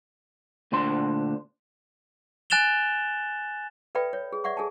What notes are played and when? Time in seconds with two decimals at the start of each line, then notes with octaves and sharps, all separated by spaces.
0.72 D2 A#2 D4 C5 C6
2.50 G#5 F#6 A6 E7 F7 G7
3.95 A4 B4 D5 E5 G5 B5
4.13 C#5
4.32 G#4
4.44 D5 E5 F#5 C#6
4.57 G#4 A4 G#5 A5